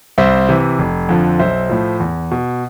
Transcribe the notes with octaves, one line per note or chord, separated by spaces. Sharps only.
C2 C5 E5
C3 E3
F1
F2 D3 F3
B1 C5 E5
A2 F3
E2
B2